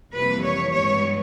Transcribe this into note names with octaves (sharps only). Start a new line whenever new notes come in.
F2 C3 E3 G3 A#3 B4
C#5
G2 E3 G#3 B3 C#5